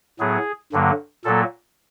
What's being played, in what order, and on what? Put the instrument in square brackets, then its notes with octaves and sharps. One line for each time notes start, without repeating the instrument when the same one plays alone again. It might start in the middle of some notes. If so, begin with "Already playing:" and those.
[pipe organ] A2 F#3 B3 G#4
G2 D3 F#3 A#3
A#2 F#3 A#3 A4